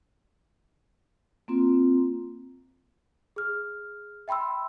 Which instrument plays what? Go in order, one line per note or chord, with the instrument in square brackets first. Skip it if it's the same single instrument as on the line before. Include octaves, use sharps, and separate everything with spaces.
[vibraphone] A#3 C4 F4
[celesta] G#4 F6
E5 G5 B5 C6 E6